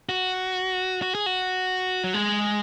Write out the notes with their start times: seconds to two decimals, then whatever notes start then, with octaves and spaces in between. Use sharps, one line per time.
0.09 F#4
1.02 F#4
1.15 G#4
1.26 F#4
2.04 F#3
2.14 G#3